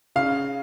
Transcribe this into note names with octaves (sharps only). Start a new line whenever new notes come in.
C#3 F5